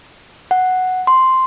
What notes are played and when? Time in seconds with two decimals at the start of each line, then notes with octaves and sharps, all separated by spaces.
0.51 F#5
1.07 C6